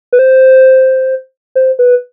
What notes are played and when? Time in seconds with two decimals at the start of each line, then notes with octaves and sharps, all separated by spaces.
0.13 B4
0.19 C5
1.55 C5
1.79 B4